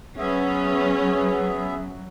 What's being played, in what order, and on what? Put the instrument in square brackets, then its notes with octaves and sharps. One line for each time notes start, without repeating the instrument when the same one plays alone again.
[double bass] F#3 [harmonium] B3 G#4 E5 [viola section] C#4